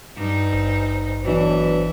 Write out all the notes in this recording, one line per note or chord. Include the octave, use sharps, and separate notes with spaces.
G2 D#4
G#1
B2 E3 F#3 D4